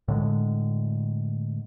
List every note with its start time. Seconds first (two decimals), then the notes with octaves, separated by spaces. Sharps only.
0.08 A2 D3 G#3